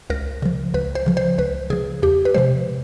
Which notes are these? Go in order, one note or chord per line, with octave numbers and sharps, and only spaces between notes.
C#2 A#4
C#3 F3
C#2 B4
C5
C#3 F3
C5
C#2 B4
C#3 F3 G#4
E2 G4
B4
C3 F3 G#3 C5